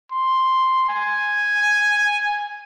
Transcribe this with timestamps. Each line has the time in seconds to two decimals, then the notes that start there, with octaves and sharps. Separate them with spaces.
0.12 C6
0.89 G#5